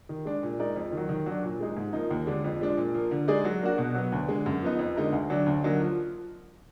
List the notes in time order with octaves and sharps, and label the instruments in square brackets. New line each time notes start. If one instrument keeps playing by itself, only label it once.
[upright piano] D#3
G#3 D4
A#2
G#3 D#4 A#4 D5
F2
D#3 F#3
D#3
F#3 D4
A#2
G#3 D#4 G#4
G#2
F3 A#3 D#4
D#2
D3 G#3 D4
F2
F3 G#3 D4
A#2
F3 A#3
D3
G#3 D#4 G#4 D5
F#3
A#3 D4 F#4
B2
F#3 B3
D2
D3 G#3
F#2
F3 B3 D#4
F2
D3 G#3 D#4 A#4
D2
D3 F#3 D4
D2
D3 F#3 A#3 D#4
F3